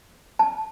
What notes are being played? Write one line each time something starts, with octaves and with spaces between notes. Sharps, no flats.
A5